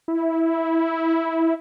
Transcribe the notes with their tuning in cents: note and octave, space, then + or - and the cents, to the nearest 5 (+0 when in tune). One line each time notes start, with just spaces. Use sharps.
E4 -10